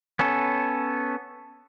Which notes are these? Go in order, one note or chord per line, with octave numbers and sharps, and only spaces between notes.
B3 C#4 A4